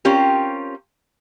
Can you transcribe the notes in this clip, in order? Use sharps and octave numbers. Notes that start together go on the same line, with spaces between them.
C4 C#4 F4 G4 A#4